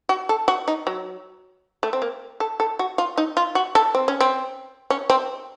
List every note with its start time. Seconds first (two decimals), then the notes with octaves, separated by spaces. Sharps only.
0.09 F#4
0.29 A4
0.48 F#4
0.68 D#4
0.87 F#3
1.83 A3
1.93 C4
2.02 A#3
2.40 A4
2.60 A4
2.79 F#4
2.98 F4
3.18 D#4
3.37 F4
3.55 F#4
3.75 A4
3.95 C4
4.08 C#4
4.20 C4
4.90 C#4
5.10 C4